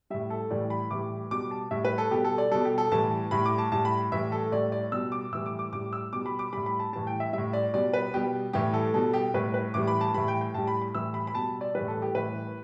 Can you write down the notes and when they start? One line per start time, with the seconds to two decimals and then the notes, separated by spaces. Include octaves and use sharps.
0.10 A2 G3 E5
0.30 A4
0.51 A2 E3 G3 D5
0.70 B5
0.91 A2 E3 G3 D6
1.31 B2 G3 D6
1.51 A5
1.71 A2 G3 E5
1.85 B4
1.98 A4
2.11 B2 G3 G4
2.25 A4
2.38 D5
2.52 B2 G3 A4
2.65 G4
2.78 A4
2.92 A2 E3 G3 A5
3.31 A2 G3 B5
3.46 D6
3.58 A5
3.72 A2 G3 A5
3.85 B5
4.12 A2 E3 G3 E5
4.32 A4
4.52 A2 G3 D5
4.72 D5
4.92 B2 G3 E6
5.12 D6
5.32 A2 E3 G3 E6
5.46 D6
5.59 D6
5.73 A2 G3 D6
5.93 E6
6.13 B2 G3 D6
6.26 B5
6.39 D6
6.53 A2 G3 B5
6.66 B5
6.79 A5
6.93 A2 E3 G3 A5
7.07 G5
7.20 E5
7.33 A2 G3 E5
7.53 D5
7.74 B2 G3 D5
7.94 B4
8.14 B2 G3 G4
8.53 A2 E3 G3 G4
8.74 A4
8.94 B2 G3 A4
9.14 G4
9.34 A2 G3 B4
9.54 B4
9.74 A2 E3 G3 D6
9.87 B5
10.01 A5
10.14 A2 E3 G3 B5
10.28 G5
10.41 G5
10.54 A2 G3 A5
10.67 B5
10.82 B5
10.95 A2 E3 G3 E6
11.14 B5
11.27 B5
11.35 B2 G3 A5
11.61 D5
11.75 A2 E3 G3 B4
11.88 A4
12.02 G4
12.15 A2 E3 G3 B4